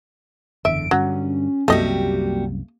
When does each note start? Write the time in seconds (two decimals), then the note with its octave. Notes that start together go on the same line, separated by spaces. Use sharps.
0.65 F#1 E2 D3 E5 D7
0.91 G2 D3 F#3 C#4
1.68 C2 F#2 C3 G3 A3 A#3 F#4 D#5